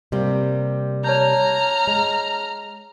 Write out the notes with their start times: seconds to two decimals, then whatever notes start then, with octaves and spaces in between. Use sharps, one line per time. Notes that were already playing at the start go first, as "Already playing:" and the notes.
0.12 C3 G3 A#3
1.04 C#5 A5 A#5 F6 G6
1.87 G#3